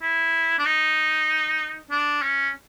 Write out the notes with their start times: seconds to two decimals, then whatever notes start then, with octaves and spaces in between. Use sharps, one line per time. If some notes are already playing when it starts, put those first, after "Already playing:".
0.02 E4
0.59 D4
0.65 D#4
1.91 D4
2.22 C#4